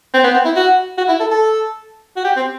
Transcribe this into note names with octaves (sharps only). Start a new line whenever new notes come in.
C4
B3
C4
E4
F#4
F#4
E4
A4
A4
F#4
G4
C4